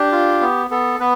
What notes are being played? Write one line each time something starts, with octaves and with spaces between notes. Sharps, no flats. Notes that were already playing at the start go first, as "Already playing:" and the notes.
Already playing: D4 G4
F4
B3
B3 A4
B3 B4